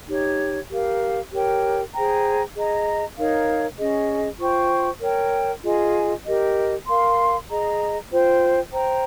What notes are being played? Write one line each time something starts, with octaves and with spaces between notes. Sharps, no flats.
D#4 G4 C#5
G4 A#4 F5
G4 A#4 C#5 G5
G#4 C5 G5 A#5
G#4 D#5 A#5
D#4 A#4 C#5 F5
C#4 G#4 D#5
F4 C5 G5 C#6
A#4 C#5 G5
F4 G#4 D#5 G#5
G4 A#4 D#5
A#4 F5 C6
G#4 D#5 A#5
F4 C5 G5
C5 G5 A#5